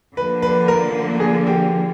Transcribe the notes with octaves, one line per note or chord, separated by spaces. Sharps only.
D3 F3 A#3 B4
B4
A#4
G#4
G4